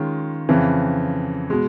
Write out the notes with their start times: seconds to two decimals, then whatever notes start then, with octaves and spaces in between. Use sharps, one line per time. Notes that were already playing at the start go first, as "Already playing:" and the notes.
Already playing: D#3 G#3 C#4 F4
0.49 F2 C#3 E3
1.50 B2 G#3